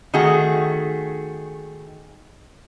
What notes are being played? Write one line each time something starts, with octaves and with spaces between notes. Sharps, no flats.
D#3 A3 F#4 G#4